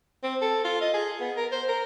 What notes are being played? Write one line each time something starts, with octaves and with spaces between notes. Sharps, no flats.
C4
A4
F4
D#5
G#4
B3
A#4
C5
A#4